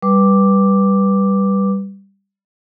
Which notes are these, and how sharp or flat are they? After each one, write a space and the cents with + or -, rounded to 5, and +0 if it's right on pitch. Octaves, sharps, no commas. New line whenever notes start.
G3 +0 B4 -10 D6 +0